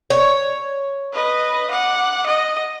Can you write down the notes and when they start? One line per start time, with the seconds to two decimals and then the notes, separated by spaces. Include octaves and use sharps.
0.10 C#5
1.13 B4 D#5
1.71 F#5 D6
2.26 D#5